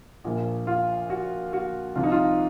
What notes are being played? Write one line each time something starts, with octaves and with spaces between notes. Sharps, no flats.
A#1 A#2 F3
F4
F#4
F#4
C2 C3 F3 F4
D#4
F4